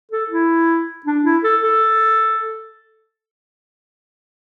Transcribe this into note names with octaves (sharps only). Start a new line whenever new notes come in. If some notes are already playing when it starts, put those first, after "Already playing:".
A4
E4
D4
E4
A4
A4